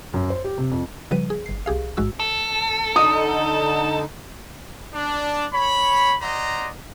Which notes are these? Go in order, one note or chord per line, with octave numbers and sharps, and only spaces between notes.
F#2
C5
G4
C3
F2
C#3 F3 G3 B4 D#7
G#4
G1 C7
C2 G4 G#4 F5
A1 G#2 G#3 F#4 E6
A4
D3 D#4 D#6
D4
C#5 B5
C5 D5 D#5 F#5 A#5